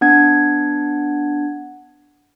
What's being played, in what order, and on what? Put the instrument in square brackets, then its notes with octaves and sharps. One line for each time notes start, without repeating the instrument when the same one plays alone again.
[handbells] B3 D4 F#5 G#6